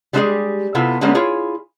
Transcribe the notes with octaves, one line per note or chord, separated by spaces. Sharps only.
G3 G#3 C4 E4 G4 G#4
C3 B3 E4 F4 A4
D3 G3 G#3 A#3 B3 C#4
E4 F4 G#4 C#5